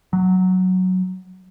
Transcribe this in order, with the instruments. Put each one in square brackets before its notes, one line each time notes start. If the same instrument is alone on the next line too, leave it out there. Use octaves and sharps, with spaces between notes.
[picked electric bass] F#3